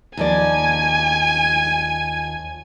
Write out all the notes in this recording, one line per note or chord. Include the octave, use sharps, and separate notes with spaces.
D#2 F3 D5 G#5